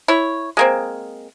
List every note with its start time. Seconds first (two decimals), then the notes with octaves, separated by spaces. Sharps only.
0.08 E4 C#5
0.57 G#3 A#3 C4